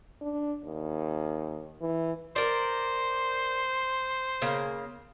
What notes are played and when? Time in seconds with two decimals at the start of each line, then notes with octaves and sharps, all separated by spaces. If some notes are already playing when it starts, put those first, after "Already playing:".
0.22 D4
0.65 D#2
1.81 E3
2.36 A#4 C5 D5
4.42 C#3 A#3